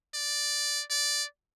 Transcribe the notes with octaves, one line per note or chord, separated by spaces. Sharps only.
D5
D5